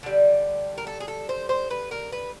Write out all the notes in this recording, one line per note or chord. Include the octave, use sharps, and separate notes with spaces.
D3 G3
A#4
A4
G#4
A4
C5
C5
B4
A#4
B4